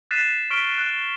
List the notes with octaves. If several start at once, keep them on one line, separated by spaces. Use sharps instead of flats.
F#6 A6 B6 C7 D#7 E7
C#6 F6 B6 D7 G7
F#6